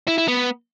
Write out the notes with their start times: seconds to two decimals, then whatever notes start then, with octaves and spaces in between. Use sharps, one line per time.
0.08 E4
0.18 E4
0.28 B3